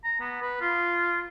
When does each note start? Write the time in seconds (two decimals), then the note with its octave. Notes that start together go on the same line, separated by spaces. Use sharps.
0.04 A#5
0.21 B3
0.42 B4
0.61 F4